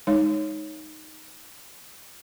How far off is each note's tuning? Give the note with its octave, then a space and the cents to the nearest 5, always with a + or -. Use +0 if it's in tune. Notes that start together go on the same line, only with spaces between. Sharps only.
G#3 -5 D#4 +0 C#5 +0